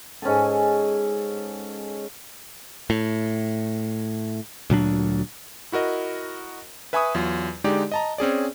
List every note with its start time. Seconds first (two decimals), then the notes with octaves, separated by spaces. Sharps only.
0.22 G#2 C#4 G#4 A4
2.90 A2
4.70 D2 A#2 F#3 D4
5.72 E4 F#4 A#4 D#5
6.93 B4 E5 G#5 B5 C#6 D#6
7.15 E2 F#3 F4
7.64 D3 G#3 D#4 G4 D5
7.92 D#5 A5 A#5
8.18 C4 C#4 G#4 D5